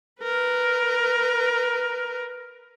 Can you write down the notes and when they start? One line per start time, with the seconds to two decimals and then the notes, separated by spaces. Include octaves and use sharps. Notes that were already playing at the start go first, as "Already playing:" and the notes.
0.22 A#4 B4